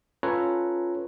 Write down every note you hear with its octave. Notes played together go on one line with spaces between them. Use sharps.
C#4 F4 A4 B4 C#5 A#5